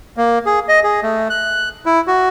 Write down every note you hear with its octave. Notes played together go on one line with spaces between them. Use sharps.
A#3
G#4
D#5
G#4
A3
F#6
E4
F#4